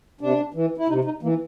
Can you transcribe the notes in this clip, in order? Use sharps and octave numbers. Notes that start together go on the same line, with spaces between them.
C3 D4
E3
E4
C3 D#4
D#4
E3 A#3